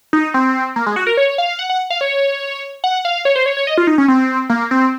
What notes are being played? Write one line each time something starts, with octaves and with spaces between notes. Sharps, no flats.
D#4
C4
A#3
G#3
F#4
A#4
C#5
F5
F#5
F#5
F5
C#5
F#5
F5
C#5
C5
C#5
C#5
D#5
F4
D#4
C#4
C4
A#3
C4